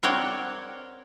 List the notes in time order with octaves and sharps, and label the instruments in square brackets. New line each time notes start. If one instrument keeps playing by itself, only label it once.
[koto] C4 A#4 C#5 D5 F#5 G5